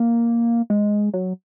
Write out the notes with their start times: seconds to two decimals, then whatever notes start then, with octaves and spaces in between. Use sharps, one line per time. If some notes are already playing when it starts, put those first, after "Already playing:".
Already playing: A#3
0.70 G#3
1.14 F#3